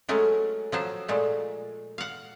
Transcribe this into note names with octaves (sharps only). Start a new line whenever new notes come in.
F#3 G#3 A3 C#4
F3 F#3 C5
A#2 G#3 A3
F5 F#5